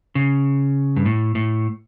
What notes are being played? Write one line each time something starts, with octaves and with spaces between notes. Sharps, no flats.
C#3
G2
A2
A2